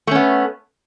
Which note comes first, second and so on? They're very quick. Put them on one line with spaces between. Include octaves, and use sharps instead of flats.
A3 C#4 B3